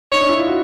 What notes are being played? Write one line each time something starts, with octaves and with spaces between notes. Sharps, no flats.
D#4 C#5
D4
E4
F4
F#4